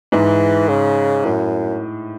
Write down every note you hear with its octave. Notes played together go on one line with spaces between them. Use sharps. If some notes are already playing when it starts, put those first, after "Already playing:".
G#2 E3
C#3
F#2 A2